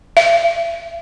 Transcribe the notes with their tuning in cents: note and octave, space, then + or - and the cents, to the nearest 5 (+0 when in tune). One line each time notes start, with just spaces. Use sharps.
E5 +40